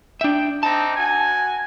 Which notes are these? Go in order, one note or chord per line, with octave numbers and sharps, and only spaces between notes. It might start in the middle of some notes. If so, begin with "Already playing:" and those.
D4 E5 G5
C4 D4 D#4 A5
F#4 G#5